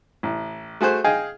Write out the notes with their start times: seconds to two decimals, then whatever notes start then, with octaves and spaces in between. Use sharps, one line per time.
0.23 A1
0.81 A3 F#4 G#4 C5 F#6
1.04 G#4 D#5 F5 G5 G#5